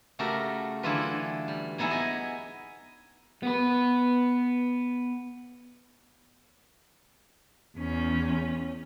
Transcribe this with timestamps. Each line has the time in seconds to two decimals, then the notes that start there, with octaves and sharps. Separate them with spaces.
0.19 C#3 A3 F#4 G4 A4 A#4
0.83 D3 E3 F#3 F4 A4 B4
1.48 G3
1.78 F#3 B3 D#4 E4 G#4
1.91 D#5 G#5
3.43 B3 B4
7.77 E2 C#4